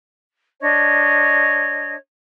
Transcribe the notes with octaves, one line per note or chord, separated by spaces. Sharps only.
D4 C#5 D#5